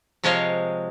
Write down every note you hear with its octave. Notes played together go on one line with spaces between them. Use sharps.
C3 F3 G#3 C#5 D#5 F5